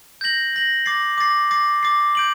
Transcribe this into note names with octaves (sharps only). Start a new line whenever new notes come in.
G6 A#6 F#7
G6 A#6 F#7
D6 A6 C7
D6 A6 C7
D6 A6 C7
D6 A6 C7
G6 D7 F#7